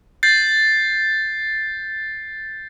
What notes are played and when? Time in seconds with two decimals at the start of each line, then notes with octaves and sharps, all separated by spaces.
0.23 G6 A6 C7